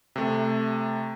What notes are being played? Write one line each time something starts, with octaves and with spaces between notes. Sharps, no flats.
C3 A3